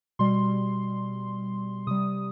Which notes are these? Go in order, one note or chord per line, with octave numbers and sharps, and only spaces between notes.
B2 G3 C6
C3 G3 D#6